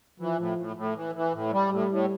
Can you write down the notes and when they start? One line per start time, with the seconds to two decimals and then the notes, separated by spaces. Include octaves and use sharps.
0.20 E3 F3
0.39 A2
0.58 A2
0.76 A2
0.96 E3
1.15 E3
1.34 A2
1.52 G3
1.71 A2 G3
1.91 A2